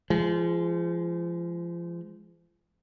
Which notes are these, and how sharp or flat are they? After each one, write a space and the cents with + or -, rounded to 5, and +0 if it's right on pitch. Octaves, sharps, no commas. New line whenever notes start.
F3 -30 G#3 +0